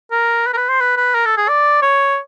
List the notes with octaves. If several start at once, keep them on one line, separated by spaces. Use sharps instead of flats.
A#4
B4
A#4
B4
C5
B4
B4
A#4
A4
G#4
D5
C#5